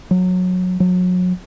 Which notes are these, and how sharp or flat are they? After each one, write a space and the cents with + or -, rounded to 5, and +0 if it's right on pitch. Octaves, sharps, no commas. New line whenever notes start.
F#3 -20
F#3 -30